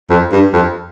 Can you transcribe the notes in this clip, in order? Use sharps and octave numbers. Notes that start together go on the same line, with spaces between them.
F2
G2
F2